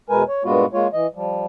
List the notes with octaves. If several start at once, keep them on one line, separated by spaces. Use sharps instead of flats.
E2 B2 G#3 A#4 B4 G#5
C#5
G2 A#2 G#3 B3 F4 F#4
G#3 A#3 F4 C#5
E3 D#5
F3 G3